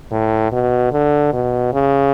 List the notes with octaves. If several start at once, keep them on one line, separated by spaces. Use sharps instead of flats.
A2
B2
D3
B2
C#3